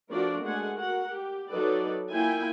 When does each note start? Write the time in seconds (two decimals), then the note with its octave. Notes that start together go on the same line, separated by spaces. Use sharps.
0.11 F3 A3 D4 F#4 A#4 D5
0.44 G#3 A3 D4 F#5 G#5
0.74 F#4 A#4 F#5
1.10 G4
1.49 F#3 D#4 A4 B4 D5
2.12 A#3 E4 F4 E5 G5 G#5